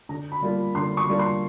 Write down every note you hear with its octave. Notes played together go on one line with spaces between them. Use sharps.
D3 A#5
B5
G3 A#3 D4 F4
D3 C6
C#6
G3 A#3 D4 F4
C6